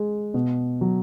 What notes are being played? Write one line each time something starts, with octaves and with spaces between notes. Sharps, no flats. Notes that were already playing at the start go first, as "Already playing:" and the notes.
Already playing: G#3
B2
F#3